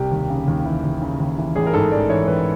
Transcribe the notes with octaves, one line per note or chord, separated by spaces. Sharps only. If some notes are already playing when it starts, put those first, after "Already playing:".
Already playing: C2 G4
D#2
C#3
D#2
E3
D#2
C#3
D#2
E3
A1 G#4
A#4
G#2 A4
A1 D5
E3 C#5
A1 B4